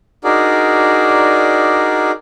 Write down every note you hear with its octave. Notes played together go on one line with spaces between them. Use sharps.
D4 D#4 F#4 G#4 A#4 D5